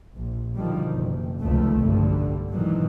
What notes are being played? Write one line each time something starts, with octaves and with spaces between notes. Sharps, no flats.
A#1
B2 D3 D#3 F3 G3
F#1
F1 C#2 D#3 F3 A3
B1 G2 D3
G#2 B2 D#3 E3 F#3